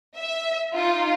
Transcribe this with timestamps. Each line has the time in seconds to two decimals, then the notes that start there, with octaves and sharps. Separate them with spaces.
0.16 E5
0.73 D#4 F4